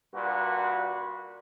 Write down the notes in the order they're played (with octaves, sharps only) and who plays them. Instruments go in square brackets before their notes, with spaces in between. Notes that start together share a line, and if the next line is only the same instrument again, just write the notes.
[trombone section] G2 A#2 F#4 B4